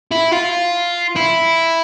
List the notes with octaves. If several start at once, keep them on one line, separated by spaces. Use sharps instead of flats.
E4
F4
E4